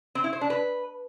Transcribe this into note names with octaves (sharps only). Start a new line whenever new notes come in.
C4
E4
C5
D4
B4